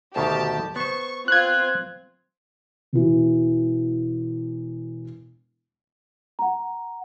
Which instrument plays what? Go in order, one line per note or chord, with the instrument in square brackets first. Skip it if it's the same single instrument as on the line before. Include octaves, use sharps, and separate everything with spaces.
[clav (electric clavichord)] D2 B2 D#3 [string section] G4 A5
[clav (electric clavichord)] B3 C5 [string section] C#6
[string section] C4 F4 [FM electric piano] F#6 G#6
[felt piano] E1 E3
[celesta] F#5 A#5